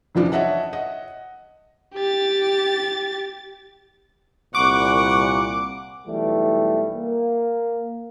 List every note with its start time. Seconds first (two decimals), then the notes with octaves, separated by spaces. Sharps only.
0.15 F1 C#3 E3 F3 D4
0.32 C#5 D#5 E5 F#5 A5
0.73 D#5 F#5
1.95 G4 A6
4.55 C2 A#2 F#5 B5 C#6 D6 F#6
6.07 B1 E3 G3 A3
6.96 A#3